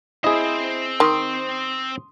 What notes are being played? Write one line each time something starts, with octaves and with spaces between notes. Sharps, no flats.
C4 E4 G#4 C5 D#5
D#3 C6 D#6